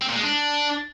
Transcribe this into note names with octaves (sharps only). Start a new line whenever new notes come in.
C4
A#2
G#3
D4